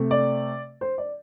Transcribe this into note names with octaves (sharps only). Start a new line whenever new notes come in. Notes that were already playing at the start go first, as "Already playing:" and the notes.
Already playing: C3 A3
D5
C5
D5